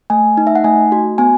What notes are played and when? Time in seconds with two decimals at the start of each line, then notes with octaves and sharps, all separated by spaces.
0.10 A3 G#5
0.37 D#4
0.47 E5
0.55 F#5
0.64 A3 G#5
0.92 F#4
1.18 B3 G#5